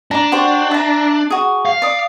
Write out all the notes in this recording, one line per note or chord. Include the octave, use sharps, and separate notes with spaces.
D4 D5 A#5
F#4 G4 C5
E5 A#5
F#4 G#4
F5
D5 D#6